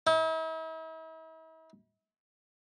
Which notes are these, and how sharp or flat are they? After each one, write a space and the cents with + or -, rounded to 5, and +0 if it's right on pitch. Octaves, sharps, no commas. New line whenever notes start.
E4 -45